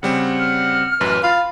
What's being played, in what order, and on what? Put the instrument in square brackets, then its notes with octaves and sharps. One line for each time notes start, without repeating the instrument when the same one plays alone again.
[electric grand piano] C#3 G3 C4 [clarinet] F#5
[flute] F6
[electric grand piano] A1 F#2 [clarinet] B4
[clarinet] F4 [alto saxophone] F5 [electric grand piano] B5 A6